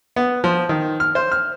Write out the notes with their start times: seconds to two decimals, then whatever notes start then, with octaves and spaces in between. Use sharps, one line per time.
0.16 B3
0.44 F3
0.69 D#3
1.00 F6
1.15 C5
1.32 F6